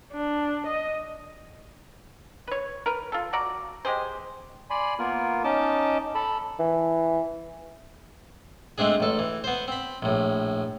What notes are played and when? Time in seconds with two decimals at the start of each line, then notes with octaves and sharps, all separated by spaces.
0.12 D4
0.67 D#5
2.48 B4 C#5
2.86 A#4 B4
3.12 F4 A4
3.33 F#4 D5 A#5
3.85 G#3 G4 G#4 C5
4.70 D5 G#5 B5 C6
4.99 A#3 B3 F4 A#4
5.44 C#4 D#4 D#5 A5 D6
6.15 A4 A5 B5
6.59 E3
8.78 G#3 A3 C4 D4 G#4
9.00 A1 A4
9.19 E3
9.44 B3 C5
9.68 C4 B5
10.02 A#1 A2